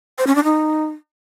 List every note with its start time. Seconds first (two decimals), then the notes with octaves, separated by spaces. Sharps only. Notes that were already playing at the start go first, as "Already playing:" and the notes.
0.18 C5
0.27 C#4
0.35 D4
0.44 D#4